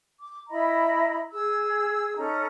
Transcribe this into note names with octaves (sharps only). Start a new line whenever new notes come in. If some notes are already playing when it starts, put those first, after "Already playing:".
D6
E4 D#5 A#5 B5
G#4 E6
C#4 D#4 A4 A#5